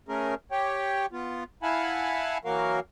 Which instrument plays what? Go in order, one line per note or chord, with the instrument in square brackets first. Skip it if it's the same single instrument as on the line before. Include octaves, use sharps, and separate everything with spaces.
[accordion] A3 C#4 G#4 A#4
G4 C#5 G5
B3 F4
E4 F5 F#5 G#5 A5 B5
E3 F#3 A#3 F#4 A#4 F5